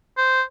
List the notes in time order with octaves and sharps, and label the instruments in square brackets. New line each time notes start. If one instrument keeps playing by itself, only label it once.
[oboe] C5